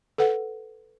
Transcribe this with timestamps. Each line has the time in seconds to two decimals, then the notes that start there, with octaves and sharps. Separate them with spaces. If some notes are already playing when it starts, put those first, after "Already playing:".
0.18 A4 B4 F#5